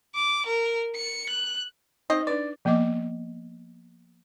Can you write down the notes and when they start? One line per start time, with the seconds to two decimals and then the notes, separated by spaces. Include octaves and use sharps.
0.15 D6
0.46 A#4
0.95 C#7
1.29 F#6
2.10 C4 D#4 D#5
2.27 D4 B4 D5
2.65 F3 A#3 B3 D#5 D6